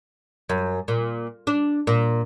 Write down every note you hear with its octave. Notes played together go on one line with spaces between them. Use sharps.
F#2
A#2
D4
A#2